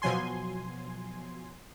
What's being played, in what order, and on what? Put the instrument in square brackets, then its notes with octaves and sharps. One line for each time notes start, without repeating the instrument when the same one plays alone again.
[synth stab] B2 F3 F#3 G#5 C6